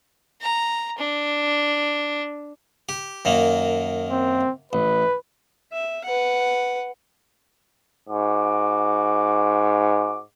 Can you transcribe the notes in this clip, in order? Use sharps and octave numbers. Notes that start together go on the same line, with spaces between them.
A#5
D4
G4
F#2 D#3 A#3
C4
A1 B4
E5
B4 F#5
G#2 F#4 D6